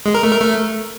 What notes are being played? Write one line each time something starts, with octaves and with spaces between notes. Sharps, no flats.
G#3
A#4
A3
A#4
A3